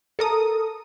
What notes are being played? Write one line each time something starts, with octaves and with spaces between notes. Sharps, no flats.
A4 A#4 D#6